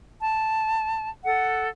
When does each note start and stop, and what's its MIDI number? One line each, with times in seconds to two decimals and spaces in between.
0.20 1.11 81
1.24 1.68 69
1.24 1.68 78